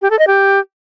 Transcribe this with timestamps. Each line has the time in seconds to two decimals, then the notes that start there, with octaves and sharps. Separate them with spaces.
0.02 G4
0.10 A4
0.19 D#5
0.27 G4